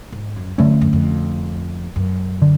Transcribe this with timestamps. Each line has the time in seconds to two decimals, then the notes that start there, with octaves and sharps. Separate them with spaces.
0.12 G#2
0.36 F#2
0.58 F#2 D3 F3 A3 C#4
0.70 F2
0.81 F2
0.93 F2
1.96 F#2
2.42 D3